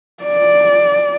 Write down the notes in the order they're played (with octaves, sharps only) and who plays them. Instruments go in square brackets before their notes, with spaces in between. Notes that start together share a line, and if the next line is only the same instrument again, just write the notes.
[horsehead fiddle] D5